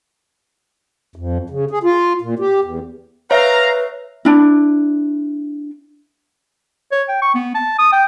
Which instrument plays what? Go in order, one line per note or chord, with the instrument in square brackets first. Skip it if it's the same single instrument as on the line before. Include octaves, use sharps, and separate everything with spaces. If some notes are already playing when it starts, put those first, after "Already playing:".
[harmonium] F2
C#3
G#4
F4
A#2
G4
E2
[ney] B4 [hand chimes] C#5 E5 [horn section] F5 A#5
[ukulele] D4 E4
[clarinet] C#5
G5
C#6
B3
A5
D#6
G5